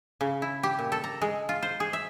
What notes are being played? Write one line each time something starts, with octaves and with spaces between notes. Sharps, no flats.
C#3
E4
G4
A#2
A4
A#5
G#3
F4
C5
G#4
E5